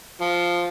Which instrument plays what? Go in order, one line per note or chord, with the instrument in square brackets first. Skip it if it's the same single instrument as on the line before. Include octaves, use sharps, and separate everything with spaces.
[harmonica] F3